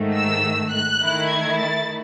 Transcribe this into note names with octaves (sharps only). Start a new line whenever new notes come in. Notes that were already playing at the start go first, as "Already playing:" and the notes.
Already playing: G#2 D#3 A3
E6
F#6
D#3 A3 E4
G#6
A6